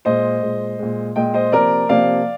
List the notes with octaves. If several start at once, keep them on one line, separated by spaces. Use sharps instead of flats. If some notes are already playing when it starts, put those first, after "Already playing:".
A#2 G#3 C5 D#5
A#2 G#3
A#2 G#3
A#2 G#3 D#5 G5
C5 D#5
C3 F3 A#3 A#4 D5
C3 F3 A#3 D5 F5